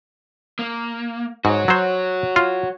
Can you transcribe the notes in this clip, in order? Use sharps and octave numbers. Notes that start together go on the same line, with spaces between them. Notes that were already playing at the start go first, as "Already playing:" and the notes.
A#3
G#2 F#4 C#5
F#3 C5
F4